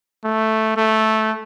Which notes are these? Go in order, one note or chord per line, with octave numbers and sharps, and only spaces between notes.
A3
A3